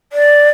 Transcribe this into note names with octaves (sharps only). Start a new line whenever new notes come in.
D5